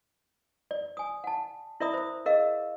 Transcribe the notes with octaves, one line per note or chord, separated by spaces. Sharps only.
D5
G#5 D#6
F#5 A5
E4 A#4 D5 E5 B5 D#6
C5 D#6
G#4 A#4 D#5 F5